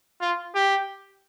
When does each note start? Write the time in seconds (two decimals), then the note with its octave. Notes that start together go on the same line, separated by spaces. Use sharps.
0.21 F4
0.55 G4